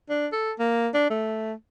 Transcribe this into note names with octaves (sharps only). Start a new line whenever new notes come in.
D4
A4
A#3
D4
A3